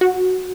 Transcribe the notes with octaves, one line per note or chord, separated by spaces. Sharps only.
F#4